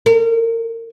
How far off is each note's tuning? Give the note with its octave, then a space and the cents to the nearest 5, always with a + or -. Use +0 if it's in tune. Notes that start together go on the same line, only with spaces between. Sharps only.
A#4 -30